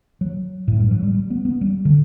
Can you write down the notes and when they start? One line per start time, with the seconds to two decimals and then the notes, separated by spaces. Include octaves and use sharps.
0.21 F#3
0.68 A2
0.79 G2
0.91 F#3
1.03 G3
1.14 G3
1.30 B3
1.45 B3
1.61 G3
1.85 D3